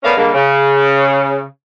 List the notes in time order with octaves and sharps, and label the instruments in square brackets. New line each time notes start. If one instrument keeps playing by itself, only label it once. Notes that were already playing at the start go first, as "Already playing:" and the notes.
[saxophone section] A3 B3 C#4 A#4 D5 F5
D3 G3 G#3 A#3
C#3